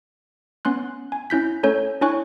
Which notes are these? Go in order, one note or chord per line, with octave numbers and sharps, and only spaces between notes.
B3 C#4 C6 F#6
G#5
C#4 E4 G6 B6
A3 C#4 A4 C#5 G6
D4 E4 C#5 G#5 C#6 F#6